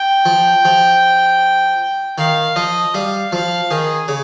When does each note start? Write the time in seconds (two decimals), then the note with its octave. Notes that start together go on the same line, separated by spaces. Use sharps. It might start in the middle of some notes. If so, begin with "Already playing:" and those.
Already playing: G5
0.25 F3
0.65 F3
2.17 D#3 F5
2.56 F3 D#5
2.94 G3 F5
3.32 F3 F5
3.70 D#3 G#4
4.08 C#3